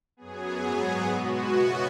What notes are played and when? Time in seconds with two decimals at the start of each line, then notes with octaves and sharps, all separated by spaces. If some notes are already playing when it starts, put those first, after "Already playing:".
0.17 F#2 F#3 B3 G#4
0.61 G#2 F#3 B3
1.07 B2 G#3 B3 F#4
1.53 F#2 C#3 E3 B3